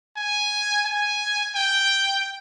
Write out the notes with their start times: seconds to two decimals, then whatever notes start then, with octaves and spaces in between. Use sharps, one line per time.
0.17 G#5
0.85 G#5
1.55 G5